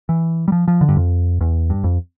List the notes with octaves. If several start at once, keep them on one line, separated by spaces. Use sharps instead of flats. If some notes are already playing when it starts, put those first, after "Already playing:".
E3
G3
F3
F3
D3
G2
F2
E2
G2
F2